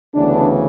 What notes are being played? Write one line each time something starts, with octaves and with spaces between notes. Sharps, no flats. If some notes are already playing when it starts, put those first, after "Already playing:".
D2 C#3 E3 B3 D4